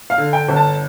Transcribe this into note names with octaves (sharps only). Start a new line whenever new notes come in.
F5
D3
G5
G1
A5